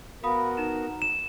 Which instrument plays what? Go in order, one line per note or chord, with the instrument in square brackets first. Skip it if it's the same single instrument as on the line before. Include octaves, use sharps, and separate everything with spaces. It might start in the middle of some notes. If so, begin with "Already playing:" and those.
[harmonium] B3 F#4 A#4 [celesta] F5 B5 D#6
[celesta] D#4 A#5 E7
[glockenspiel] E7